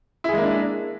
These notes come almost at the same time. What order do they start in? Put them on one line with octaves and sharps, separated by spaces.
E4 G#4 G#3 A#3 D4